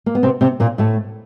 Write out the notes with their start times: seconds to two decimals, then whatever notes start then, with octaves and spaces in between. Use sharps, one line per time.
0.06 A#3
0.15 B3
0.23 C3 C4
0.41 C3 C4
0.60 A#2 A#3
0.78 A2 A3